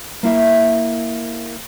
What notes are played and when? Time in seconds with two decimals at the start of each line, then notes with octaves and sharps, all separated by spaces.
0.23 A#3 E4 E5